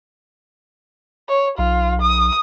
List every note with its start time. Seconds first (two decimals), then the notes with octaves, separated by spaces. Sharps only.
1.29 C#5
1.58 B1 F4
2.02 D#6